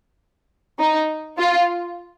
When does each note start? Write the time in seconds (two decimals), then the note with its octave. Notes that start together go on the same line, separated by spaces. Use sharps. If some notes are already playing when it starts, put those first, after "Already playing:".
0.79 D#4
1.38 F4